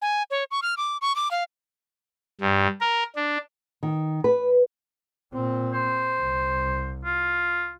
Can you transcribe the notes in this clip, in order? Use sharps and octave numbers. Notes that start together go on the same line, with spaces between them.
G#5
C#5
C#6
F6
D6
C#6
D6
F5
G2
A#4
D4
D#3
B4
A#2 C4
C5
C2
F4